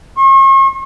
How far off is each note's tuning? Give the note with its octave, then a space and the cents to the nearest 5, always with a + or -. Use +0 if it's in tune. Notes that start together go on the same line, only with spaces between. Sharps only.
C#6 -45